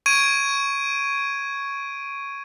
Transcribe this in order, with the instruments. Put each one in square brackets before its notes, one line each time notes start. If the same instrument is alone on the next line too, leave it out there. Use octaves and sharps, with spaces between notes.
[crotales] C#6 G#6 D7 D#7